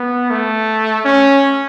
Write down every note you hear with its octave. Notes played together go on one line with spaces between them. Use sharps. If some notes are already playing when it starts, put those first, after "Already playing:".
Already playing: B3
A3
C#4